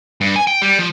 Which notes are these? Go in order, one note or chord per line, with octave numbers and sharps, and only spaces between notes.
G2
G#5
G5
G3
F3